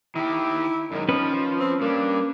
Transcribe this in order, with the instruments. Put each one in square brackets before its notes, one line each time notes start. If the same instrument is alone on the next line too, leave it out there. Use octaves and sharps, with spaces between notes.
[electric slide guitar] D#3 G4 [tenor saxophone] E4
[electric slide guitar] F#2 G#3 [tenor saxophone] D#3
[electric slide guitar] F3 [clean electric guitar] C#4 B4
[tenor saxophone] C4
[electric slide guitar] G3 D4 [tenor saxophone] A#3